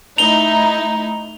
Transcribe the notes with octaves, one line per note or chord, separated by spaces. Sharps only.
A3 D#4 E4 F7 G7